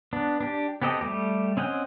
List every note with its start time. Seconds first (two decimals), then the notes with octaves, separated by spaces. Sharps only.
0.13 B3 D4
0.41 D4 G4
0.82 B3 C4 G4 A4 D#5
1.01 G3 A3 G4
1.57 C4 C#4 D#5 F#5 G5